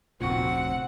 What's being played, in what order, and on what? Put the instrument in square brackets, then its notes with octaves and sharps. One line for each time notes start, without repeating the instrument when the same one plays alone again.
[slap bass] F1 D2 [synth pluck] A#2 F#4 [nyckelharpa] C4 [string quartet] F#5